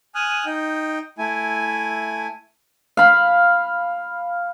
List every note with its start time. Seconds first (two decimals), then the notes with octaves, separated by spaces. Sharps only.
0.15 G#5 D#6 F6 F#6
0.46 D#4 G5
1.18 A3 E4 G#5
2.97 F5 B5